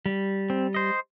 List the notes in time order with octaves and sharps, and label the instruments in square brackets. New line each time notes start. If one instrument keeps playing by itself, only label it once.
[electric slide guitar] G3
[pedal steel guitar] C4
C5 D#5